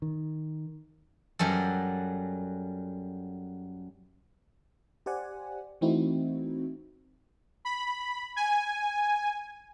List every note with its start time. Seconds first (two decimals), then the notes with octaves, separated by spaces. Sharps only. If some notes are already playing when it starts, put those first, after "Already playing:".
0.02 D#3
1.39 F#2 F#3 G3 A4
5.06 G4 C5 D5 F#5 G#5
5.81 E3 A3 C4 D#4 E4 F#4
7.65 B5
8.36 G#5